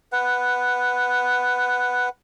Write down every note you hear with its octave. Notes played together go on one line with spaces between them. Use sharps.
B4 F#5